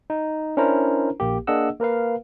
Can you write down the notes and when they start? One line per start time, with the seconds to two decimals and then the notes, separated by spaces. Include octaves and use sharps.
0.10 D#4
0.57 C#4 D4 E4 A#4 C5 A#5
1.20 A#1 A#3 G4
1.47 A#3 D4 G#4 D#5 F#5 E6
1.80 A#3 A#4 B4 F5